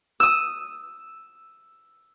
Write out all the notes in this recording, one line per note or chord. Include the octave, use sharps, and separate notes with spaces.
D#6 E6